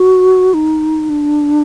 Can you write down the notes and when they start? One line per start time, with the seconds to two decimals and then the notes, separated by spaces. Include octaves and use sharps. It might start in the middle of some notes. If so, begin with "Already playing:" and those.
Already playing: F#4
0.54 D#4
1.09 D4